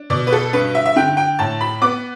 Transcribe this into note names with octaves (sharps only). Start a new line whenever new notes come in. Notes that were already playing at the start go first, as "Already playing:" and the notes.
Already playing: D4
B2 D5
B4
A4
G2 B4
E5
E5
D3 G5
G5
A2 A5
B5
B3 D6